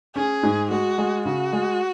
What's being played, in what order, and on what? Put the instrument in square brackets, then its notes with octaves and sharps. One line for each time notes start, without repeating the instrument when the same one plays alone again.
[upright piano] C#4 [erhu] G#4
[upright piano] G#2
[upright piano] G#3 [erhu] F#4
[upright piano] G#3
[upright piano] C#3 [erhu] F#4
[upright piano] G#3